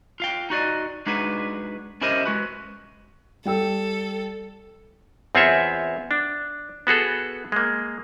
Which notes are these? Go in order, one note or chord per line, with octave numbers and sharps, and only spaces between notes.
F4 F5 G5
D#4 F#4 D5 D#5
G#3 D4 D#4 F#4 G#4 B4
C#4 E4 G4 A#4 C5 D#5
G#3 F#4 B4
G3 A4 G5 E6
E2 C4 F4 G#4 C#5 E5
D4
B3 F#4 G#4 A4
G#3 A#3